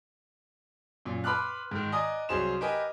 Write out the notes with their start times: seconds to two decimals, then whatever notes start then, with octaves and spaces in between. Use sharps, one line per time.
1.06 F#2 A#2
1.24 B4 B5 C6 D6 F6 F#6
1.71 G#2 D#3
1.92 D5 D#5 G#5 A#5 D#6
2.29 C2 F#3 G#4 C5 C6 E7
2.61 G4 A#4 B4 D#5 G#5